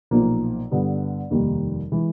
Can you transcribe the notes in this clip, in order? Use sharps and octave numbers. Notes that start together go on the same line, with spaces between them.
B1 A#2 F3 A#3
G2 D3 G3 B3
F1 D#2 D#3 G3 A#3
E3 G#3